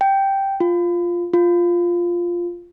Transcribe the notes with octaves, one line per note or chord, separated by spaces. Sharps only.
G5
F4
F4